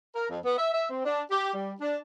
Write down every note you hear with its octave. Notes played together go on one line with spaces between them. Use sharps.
A#4
F2
B3
E5
E5
C4
D4
G4
G3
D4